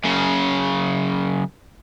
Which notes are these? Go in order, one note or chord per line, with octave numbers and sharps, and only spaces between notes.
F#2 C#3